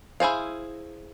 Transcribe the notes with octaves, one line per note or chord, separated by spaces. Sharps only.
E4 G#4 C5 F5